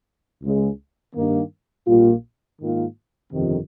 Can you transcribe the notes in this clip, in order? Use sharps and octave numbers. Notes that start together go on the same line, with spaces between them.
C#2 C#3 G#3
G2 D#3 A#3
A#1 A#2 G3 A#3 F4
G#2 D#3 A#3 F4
G1 F2 C3 D#3